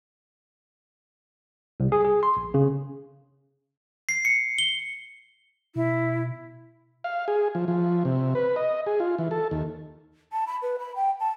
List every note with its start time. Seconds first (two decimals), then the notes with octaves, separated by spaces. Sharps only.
1.80 C2
1.92 G#4
2.05 G#4
2.23 C6
2.37 A#1
2.54 C#3
4.09 C7
4.25 C#7
4.58 G7
5.76 B2 E4
7.04 F5
7.28 G#4
7.55 F3
7.68 F3
8.05 C3
8.35 B4
8.56 D#5
8.87 G#4
9.00 F4
9.18 E3
9.31 A4
9.51 D#2
10.32 A5
10.47 B5
10.62 B4
10.79 B5
10.96 G5
11.20 A5